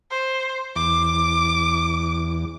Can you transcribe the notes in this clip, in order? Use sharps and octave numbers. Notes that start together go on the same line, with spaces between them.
C5
E2 D6